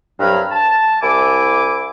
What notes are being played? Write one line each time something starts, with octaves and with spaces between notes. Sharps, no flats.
C2 G2 F#3 B5 F6
A5
C2 E4 G#5 D6